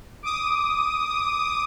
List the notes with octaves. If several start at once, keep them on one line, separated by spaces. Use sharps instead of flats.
D6 D#6